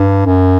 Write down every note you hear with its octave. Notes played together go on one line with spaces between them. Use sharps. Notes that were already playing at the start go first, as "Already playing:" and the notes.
Already playing: G2
F#2